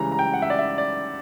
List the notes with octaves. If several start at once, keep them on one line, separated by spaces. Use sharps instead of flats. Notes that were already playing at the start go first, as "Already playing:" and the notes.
Already playing: C#2 C#3 E3 G3 A#5
A#5
G5
F#5
E5
D5
E5
D5